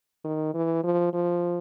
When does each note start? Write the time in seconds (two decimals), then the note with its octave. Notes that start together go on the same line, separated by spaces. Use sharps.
0.25 D#3
0.54 E3
0.84 F3
1.13 F3